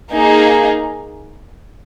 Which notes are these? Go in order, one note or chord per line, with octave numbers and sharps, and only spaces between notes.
A#3 D#4 G#4